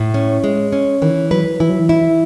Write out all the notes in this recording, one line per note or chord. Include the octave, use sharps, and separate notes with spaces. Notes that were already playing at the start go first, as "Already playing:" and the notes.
Already playing: A2
C#4
G#3
C#4
D#3 E3
F#3 B4
E3 E4
F#3
E3
E4